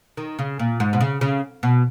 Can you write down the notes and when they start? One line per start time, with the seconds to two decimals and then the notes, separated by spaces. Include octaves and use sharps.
0.17 D#3
0.39 C#3
0.59 A#2
0.80 G#2
0.93 B2
1.01 C#3
1.21 C#3
1.63 B2